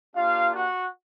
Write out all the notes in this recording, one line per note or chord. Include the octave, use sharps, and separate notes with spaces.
A#3 D4 F4 G4 F5
F#4 F#5